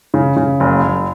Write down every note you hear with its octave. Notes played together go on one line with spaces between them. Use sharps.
C#3
C#3
F#1
F#1